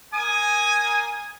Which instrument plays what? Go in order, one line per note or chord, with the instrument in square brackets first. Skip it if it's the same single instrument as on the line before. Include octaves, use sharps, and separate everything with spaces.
[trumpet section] A#3 G#5 D#6